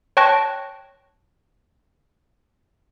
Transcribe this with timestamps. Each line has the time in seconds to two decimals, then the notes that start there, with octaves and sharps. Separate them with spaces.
0.17 C#5 G5 A5 C#6 F#6 A#6